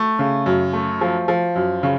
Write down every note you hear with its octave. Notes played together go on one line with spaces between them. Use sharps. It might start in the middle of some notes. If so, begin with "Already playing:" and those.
Already playing: A3
C#3
F#2
A3
F3
F3
F#2
C#3